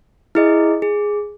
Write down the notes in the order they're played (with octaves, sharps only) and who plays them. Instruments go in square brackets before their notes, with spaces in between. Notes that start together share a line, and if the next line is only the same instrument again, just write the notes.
[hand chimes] E4 G#4 D#5
G#4